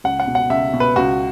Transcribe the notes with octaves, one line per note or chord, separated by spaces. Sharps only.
C#2 F#5
F#5
B2
F#5
C#2 E5
B2
B4
C#2 F#4